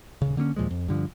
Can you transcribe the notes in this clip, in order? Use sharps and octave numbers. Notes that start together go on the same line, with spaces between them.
D#1 C#3
D3 A#3 C4 C#4
D#2 A#2 F3 G#3
F2
G2 D3 F3